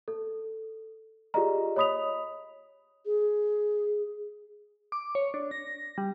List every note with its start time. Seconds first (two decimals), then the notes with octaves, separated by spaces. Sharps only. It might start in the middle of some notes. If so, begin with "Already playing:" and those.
0.08 A4
1.34 F4 G4 G#4 D5 D#5 A#5
1.76 C#5 D#5 B5 D#6 B6 F7
3.06 G#4
4.92 D6
5.15 C#5
5.34 D4
5.51 A#6
5.98 G3